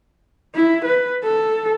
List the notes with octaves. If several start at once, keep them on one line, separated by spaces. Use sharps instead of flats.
E4
B4
A4